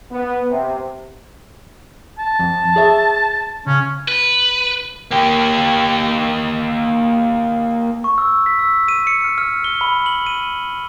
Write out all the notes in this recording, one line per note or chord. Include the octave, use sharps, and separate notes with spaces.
B3
C3
A5
F2
G#4 C#5 E5
C#3 C#4
B4
A#3 G4
C#6
E6
B6
E6
D#7
C#7
F6
F6
G7
B5
F#7
D#7